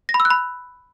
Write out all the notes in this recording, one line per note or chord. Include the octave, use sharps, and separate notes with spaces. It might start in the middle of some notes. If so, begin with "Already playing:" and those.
A#6
B5
E6
F#6
B5